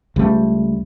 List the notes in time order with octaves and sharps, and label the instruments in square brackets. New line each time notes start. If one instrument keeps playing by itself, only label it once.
[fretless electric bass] C#2 G3 A3